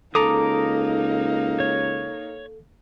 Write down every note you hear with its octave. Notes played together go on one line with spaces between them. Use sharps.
C#2 A#3 D#4 A4 A#5 D6 D#6
C#5